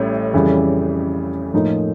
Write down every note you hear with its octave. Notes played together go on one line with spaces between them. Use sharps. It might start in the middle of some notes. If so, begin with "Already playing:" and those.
Already playing: A1 A2 G3
F2 C#3 E3 G3
A2 F3 A#3 D#4